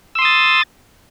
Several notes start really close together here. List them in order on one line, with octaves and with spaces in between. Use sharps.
E6 C6 D#6 A6